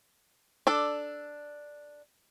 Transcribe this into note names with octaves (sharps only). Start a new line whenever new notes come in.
D4 A4 D5